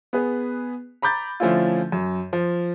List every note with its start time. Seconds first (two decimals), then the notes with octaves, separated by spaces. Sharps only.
0.13 B3 G#4 B4
1.02 A#5 B5 D6 G6 A6
1.40 D3 F3 A3 C#4 E4 F4
1.92 F#2
2.33 F3